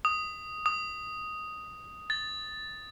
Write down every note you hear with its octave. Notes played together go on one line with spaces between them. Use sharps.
D#6
D#6
A6